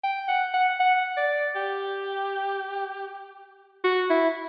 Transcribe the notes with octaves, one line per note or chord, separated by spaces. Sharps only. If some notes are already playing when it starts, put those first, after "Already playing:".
G5
F#5
F#5
F#5
D5
G4
F#4
E4